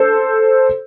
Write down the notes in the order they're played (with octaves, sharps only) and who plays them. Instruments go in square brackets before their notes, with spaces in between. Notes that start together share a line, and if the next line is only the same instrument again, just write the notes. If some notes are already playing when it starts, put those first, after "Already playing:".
Already playing: [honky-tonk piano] A4 C5